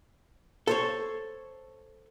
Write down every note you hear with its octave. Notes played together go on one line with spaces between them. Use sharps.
A4 C5 C#5